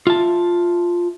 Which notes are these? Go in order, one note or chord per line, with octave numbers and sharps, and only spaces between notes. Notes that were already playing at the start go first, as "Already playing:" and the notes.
F4 E5 A5